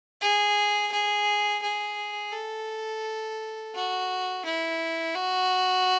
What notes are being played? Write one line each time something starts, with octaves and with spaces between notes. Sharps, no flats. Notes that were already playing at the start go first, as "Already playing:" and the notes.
G#4
G#4
G#4
A4
F#4
E4
F#4